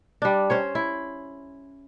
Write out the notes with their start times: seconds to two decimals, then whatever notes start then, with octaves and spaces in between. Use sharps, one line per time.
0.22 G3 D4
0.50 C#4 C5 C#5
0.75 E4